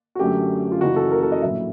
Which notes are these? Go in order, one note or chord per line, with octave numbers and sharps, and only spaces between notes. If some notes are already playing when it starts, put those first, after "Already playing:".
F#4
F#2 D3 F#3 A3 G4
F4
F#1 F#2 C#3 E3 F#4
A4
A#4
A4
D#5
A#1 A2 F#3 A3 E5